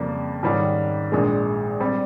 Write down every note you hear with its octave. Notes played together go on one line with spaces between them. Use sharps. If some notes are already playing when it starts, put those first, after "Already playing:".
Already playing: F2 C#3 G3 A#3
G#2 D#3 G3 C#4
A#1 A#2 G#3
G3 C4